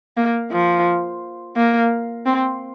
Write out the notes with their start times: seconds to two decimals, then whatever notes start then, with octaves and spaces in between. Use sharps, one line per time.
0.17 A#3
0.52 F3
1.57 A#3
2.26 C4